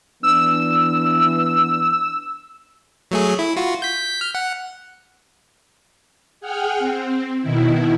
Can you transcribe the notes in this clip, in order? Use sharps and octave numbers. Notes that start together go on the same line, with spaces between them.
E3 B3 D4 E6
F#3 A3 G#4
E4
F4 F#4
G6 B6
F6
F#5
G#4 F#5 G5 F6
C4
B2 D#3 E4